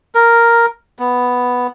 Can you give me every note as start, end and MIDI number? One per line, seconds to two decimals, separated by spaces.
0.15 0.66 70
0.99 1.67 59